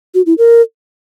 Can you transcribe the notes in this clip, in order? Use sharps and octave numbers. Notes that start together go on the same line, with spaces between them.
F#4
E4
A#4